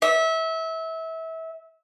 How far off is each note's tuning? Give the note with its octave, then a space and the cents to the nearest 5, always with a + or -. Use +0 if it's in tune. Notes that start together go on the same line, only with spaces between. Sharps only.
E5 -25